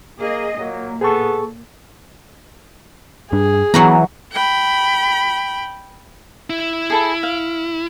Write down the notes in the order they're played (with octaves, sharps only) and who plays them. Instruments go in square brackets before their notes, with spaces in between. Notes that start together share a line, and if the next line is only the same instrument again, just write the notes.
[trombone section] A#3 [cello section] G#4 D#5
[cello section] A#2 [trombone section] F#3 A#3
[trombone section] B3 A4 [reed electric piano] G#4 C#6
[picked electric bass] G2 G3 D4 [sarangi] G#4
[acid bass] E3 [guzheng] F#3 F#5 A#5 [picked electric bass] B3
[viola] G5 B5
[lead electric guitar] E4
[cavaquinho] G#4 A4 B5
F5